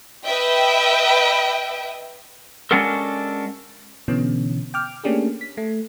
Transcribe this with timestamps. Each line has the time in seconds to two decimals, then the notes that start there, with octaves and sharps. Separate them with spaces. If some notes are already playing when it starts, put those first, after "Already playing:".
0.23 B4 D#5 E5 G5
2.71 G#3 C#4 D4 F#4 A4 A#4
4.08 B2 D3 E3 B3 C#4
4.74 G5 D6 F6
5.04 A3 A#3 C#4 D4 G4 G#4
5.41 B6
5.57 A3